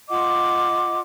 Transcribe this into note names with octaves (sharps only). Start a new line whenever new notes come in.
F4 D#5 F#5 D6